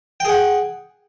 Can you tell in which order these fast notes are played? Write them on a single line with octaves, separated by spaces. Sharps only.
G5 G#4 F#5